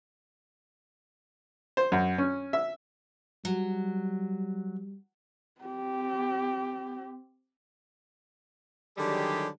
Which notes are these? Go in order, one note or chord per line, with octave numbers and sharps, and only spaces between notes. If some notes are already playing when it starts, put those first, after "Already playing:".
C5
F#2
C#4
E5
F#3 G3
C4 G4
D3 D#3 F#3 G3 G4 G#4